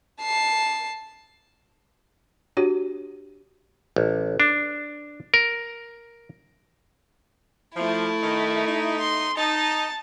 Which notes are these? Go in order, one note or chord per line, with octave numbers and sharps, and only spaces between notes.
A5 C7
D4 F#4 G4 C#5
A1
D4
A#4
F3 A3 E4
D#3 D#4
D#4
C6
D#4 A5